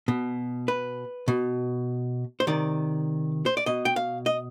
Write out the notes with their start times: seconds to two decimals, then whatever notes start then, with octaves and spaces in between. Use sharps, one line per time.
0.08 B2
0.68 B4
1.28 B2
2.40 C5
2.47 C3 D#3 D5
3.46 C5
3.57 D5
3.66 B2 D#5
3.85 G5
3.96 F5
4.26 D#5